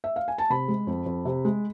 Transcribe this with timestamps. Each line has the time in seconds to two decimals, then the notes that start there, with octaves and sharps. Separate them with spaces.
0.04 E5
0.16 F5
0.28 G#5
0.38 A5
0.50 C3 B5
0.68 G#3
0.87 F2
1.06 F2
1.25 C3
1.45 G#3